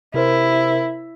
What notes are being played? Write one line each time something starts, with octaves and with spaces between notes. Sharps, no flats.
C3 E4 A#4 C5